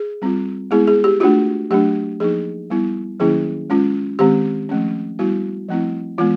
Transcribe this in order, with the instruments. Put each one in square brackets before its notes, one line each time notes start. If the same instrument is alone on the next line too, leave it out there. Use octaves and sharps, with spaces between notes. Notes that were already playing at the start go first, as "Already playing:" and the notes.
Already playing: [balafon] G#4
G3 C4 F4
G#3 B3 E4 G#4
G#4
G4
A3 D4 F4 F#4
F#3 A3 D4 G4
F3 A#3 D#4 G#4
G3 B3 E4
D#3 F#3 A#3 C#4 E4 G#4
G#3 C#4 F4
D#3 G#3 C4 G4
F3 A3 C#4
G3 B3 E4 F#4
F3 A3 C4 E4
E3 G#3 B3 F4